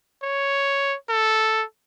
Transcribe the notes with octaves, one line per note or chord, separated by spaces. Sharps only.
C#5
A4